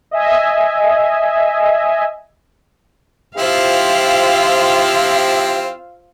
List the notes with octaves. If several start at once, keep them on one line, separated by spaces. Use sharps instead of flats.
D#5 E5 G#5
F3 C4 E4 F4 G4 C5 F5 E6